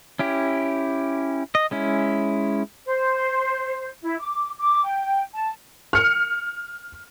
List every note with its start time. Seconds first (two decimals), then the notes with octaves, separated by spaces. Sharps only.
0.19 C#4 E4 G4
1.55 D#5
1.71 G#3 C#4 E4
2.86 C5
4.03 E4
4.20 D6
4.58 D6
4.85 G5
5.34 A5
5.93 F6 C#7